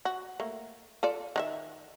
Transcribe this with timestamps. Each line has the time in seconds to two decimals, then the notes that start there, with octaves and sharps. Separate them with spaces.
0.05 F#4
0.40 A3 A#3
1.03 F4 A4 D5
1.36 D#3 F#4 E5